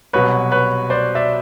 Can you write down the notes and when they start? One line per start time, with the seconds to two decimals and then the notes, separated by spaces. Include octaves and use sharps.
0.13 C2 B2 F#3 B4 C#5
0.52 B4 C#5
0.90 C5 D5
1.15 D5 E5